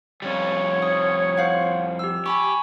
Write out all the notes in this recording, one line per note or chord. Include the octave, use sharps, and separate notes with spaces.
F2 G3 C#5
D#6
C5 F5 F#5
G4 E6
G4 G#5 B5 C#6